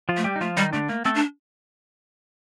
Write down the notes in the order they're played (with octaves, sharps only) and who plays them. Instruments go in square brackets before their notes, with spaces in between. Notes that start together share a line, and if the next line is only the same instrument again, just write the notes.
[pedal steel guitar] F3 F4
[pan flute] A3
[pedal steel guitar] G3 G4
D#4
[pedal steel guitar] F3 F4 [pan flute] A3
[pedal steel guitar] D#3 D#4 [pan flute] G3
[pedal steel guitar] D3 D4 [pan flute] A3
[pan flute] A3 [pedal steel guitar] A#3
[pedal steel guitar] A3 A4 [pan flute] C4
[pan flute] D4